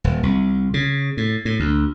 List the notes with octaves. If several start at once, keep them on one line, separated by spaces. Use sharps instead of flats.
D#1
C2
C#3
A2
A2
D2